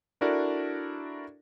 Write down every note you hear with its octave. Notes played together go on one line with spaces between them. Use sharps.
D4 E4 F#4 A4 A#4 D5